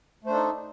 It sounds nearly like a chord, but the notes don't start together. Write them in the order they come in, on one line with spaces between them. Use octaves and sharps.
A3 C5 D4 A4 D#4